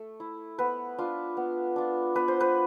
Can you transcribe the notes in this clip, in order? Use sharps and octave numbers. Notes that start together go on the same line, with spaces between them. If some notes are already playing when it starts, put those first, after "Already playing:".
Already playing: A3
E4
B3 B4
D4 F4
B3
D4 F4
B3 B4
C5
B4